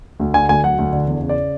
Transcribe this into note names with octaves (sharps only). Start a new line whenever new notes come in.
D2
D3 G#5
D2 G#5
F#3 F#5
D2
D3
E2
C#3
D5